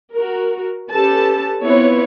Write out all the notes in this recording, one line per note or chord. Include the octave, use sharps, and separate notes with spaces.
F#4 A#4
C#4 G4 A4 B4 A5
B3 C4 E4 F4 B4 C#5